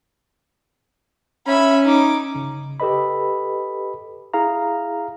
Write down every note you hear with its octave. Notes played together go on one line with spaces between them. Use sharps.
C#4 E5 B5
D#4 D6
G1 C#3
G4 A4 B4 D#5 B5
E4 G#4 F5 A#5